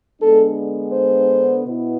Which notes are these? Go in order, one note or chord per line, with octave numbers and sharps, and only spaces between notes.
D3 G#3 B3 D4 A4
C5
B2 B3 E4